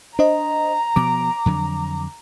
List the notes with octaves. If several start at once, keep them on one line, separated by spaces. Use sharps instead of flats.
D4 C5 D#5 A#5
B2 F3 D6
F2 D3 F#3